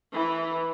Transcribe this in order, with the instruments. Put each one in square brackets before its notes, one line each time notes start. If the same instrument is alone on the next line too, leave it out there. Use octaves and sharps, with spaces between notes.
[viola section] E3